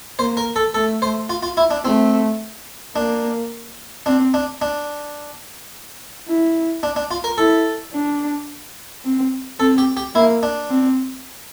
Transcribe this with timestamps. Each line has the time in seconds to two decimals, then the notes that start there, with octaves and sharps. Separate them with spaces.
0.19 A#3 C5
0.37 A#4
0.56 A4
0.74 A3 A4
1.02 C5
1.30 F4
1.43 F4
1.57 E4
1.71 D4
1.85 A3 C4
2.95 A#3 D4
4.06 C4 D4
4.34 D4
4.62 D4
6.28 E4
6.83 D4
6.96 D4
7.11 F4
7.24 A#4
7.38 E4 A4
7.93 D4
9.05 C4
9.59 C4 A4
9.78 G4
9.97 G4
10.15 A#3 E4
10.43 D4
10.70 C4